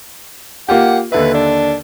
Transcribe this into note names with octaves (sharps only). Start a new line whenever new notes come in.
A#3 F4 G4 F#5
D#2 D3 B4 E5
D4